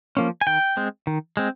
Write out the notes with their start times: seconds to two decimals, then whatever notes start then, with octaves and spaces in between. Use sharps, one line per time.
0.17 F3 A#3 C#4
0.41 G#5
0.47 D#3 G5
0.77 G#3 C4
1.07 D#3
1.37 G#3 C4